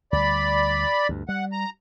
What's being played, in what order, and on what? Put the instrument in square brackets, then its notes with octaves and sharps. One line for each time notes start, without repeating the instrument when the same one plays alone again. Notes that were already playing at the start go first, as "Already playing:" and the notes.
[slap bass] D2 G3 [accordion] D5 B5
[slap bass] D2 G2
[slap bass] G3 [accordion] F#5
[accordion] A#5